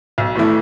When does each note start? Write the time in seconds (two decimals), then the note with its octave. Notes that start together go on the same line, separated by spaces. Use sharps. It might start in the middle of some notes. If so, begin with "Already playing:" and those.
0.18 B1
0.35 A2 E3 A3 E4